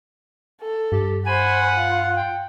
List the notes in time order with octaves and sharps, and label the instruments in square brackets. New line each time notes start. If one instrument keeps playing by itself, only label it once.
[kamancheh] A4
[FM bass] G2 [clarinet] G4
[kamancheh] C5 B5 [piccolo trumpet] F#5 [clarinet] G#5
[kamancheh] F4
[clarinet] G5